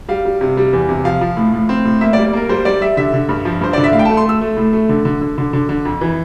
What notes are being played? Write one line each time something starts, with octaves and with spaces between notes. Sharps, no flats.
G3 F5
G3
C3
G3
E2
C3
F3 F5
F3
A2
A2
C4
A2
A#3 E5
D5
G3
D5
A#3 A#4
G3 C5
G3 D5
G3 E5
D3 E5
D3
G2
F3
G2 C5
D3 D5
E5
A2 F5
G5
A3 A5
C6
A3 E6
A3
A2
A3
D3
D3
D3
D3
D3
D3
F2
E3